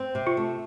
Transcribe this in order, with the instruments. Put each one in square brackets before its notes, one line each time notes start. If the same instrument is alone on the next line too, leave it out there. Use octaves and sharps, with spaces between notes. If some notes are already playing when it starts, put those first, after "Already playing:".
Already playing: [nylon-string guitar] C4
C3
[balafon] F4
[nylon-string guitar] A3